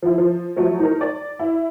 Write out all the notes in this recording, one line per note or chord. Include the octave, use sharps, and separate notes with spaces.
F3 E4
F3
F3 F#3 A3
D#4 A#4
D5
E4